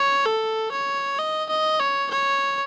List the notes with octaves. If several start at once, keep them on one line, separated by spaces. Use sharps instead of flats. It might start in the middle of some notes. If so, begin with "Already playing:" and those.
Already playing: C#5
A4
C#5
D#5
D#5
C#5
C#5